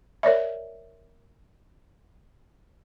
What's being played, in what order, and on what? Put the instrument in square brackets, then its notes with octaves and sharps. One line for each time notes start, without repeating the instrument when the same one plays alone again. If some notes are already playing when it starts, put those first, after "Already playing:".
[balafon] A#4 C#5 D5 E5